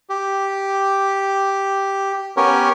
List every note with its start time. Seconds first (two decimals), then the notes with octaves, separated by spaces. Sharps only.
0.09 G4
2.37 B3 C#4 G4 A#4 C#5